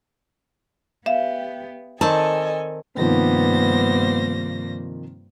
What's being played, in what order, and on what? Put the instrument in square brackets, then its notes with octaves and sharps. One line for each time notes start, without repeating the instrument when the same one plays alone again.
[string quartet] B3 G4 [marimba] E5 F5
[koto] D#3 C4 D5 [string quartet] A4 D#5 G#5 [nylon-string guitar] A5
[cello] G2 A#3 [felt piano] C3 D#3 F3 [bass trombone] B3 [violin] C5 A#6